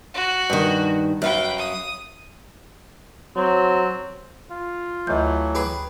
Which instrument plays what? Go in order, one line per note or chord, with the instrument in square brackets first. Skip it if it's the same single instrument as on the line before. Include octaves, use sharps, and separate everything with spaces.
[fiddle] F#4
[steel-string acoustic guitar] G2 D#3
[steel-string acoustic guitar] F#2 F5 [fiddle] B4 G5
[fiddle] D#6
[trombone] F#3 [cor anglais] C4
[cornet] F4
[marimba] D2 G6 [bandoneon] E3 F#3 A3
[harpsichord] G4 G#4 B4